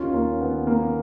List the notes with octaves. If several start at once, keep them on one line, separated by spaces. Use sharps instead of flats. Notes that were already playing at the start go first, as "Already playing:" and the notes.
Already playing: D#2 D#3 C#4 F4
A#3 C#4
B3
A#3